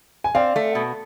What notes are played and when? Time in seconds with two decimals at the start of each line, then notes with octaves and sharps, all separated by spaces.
0.24 G#5
0.35 C4 D5 F5
0.56 A3
0.75 B2